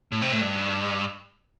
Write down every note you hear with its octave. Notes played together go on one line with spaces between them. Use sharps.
A2
C3
A2
G2